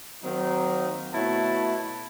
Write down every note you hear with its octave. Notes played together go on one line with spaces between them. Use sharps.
D#3 F#3 A#3 C4 D#4
B2 A3 E4 C#5 A5